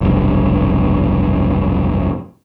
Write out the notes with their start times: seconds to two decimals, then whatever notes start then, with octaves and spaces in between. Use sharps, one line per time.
0.01 F1 B1 G2